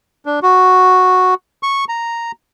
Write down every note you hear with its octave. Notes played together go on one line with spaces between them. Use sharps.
D4
F#4
C#6
A#5